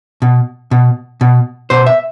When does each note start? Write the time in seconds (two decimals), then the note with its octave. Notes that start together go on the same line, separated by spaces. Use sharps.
0.22 B2
0.71 B2
1.21 B2
1.70 B2 C5
1.86 E5